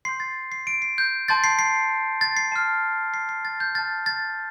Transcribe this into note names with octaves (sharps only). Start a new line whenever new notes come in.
C6 G6 C7
A6
C7
D7
C7
G6
A5 C6 G6 A6
C7
C7
A6
C7
A5 F6
C7
C7
A6
G6
A5 F6 A6
A6